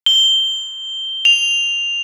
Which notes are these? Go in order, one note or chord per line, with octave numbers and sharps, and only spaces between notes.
G7
F7